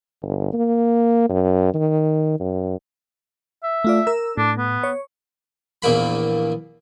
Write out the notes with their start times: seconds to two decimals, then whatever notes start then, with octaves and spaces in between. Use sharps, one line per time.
0.22 G1
0.53 A#3
1.29 F#2
1.74 D#3
2.40 F#2
3.63 E5
3.84 A3 F4 D5
4.07 A#4 E6
4.37 A2 D4
4.57 B3
4.83 C#5
5.82 A#1 E2 A#3 B5